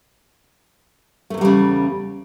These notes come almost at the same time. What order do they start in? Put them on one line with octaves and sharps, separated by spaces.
A3 G#2 E2 G3 C#3